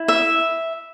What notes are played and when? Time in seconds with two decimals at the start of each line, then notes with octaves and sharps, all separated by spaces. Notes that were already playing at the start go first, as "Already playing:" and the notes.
Already playing: E4
0.08 E5